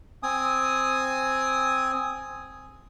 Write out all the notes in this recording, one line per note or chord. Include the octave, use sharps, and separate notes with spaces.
C4 G#5 D#6